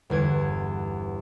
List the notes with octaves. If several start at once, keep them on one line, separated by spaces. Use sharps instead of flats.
G1 E2 G#6 D7